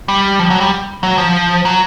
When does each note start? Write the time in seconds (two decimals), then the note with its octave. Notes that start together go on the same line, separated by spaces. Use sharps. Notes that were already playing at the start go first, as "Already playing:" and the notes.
0.08 G3
0.39 F3
0.50 F#3
0.61 G3
1.03 F#3
1.18 F3
1.65 F#3